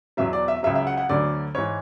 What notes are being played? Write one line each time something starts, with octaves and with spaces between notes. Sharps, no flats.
E2 B2 F#3 E5
D5
E5
C#2 C#3 F#3 E5
E5
F#5
F#5
D2 D3 F#3 D5
G#2 E3 C#5